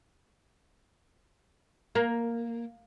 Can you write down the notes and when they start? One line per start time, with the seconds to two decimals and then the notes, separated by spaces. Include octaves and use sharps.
1.95 A#3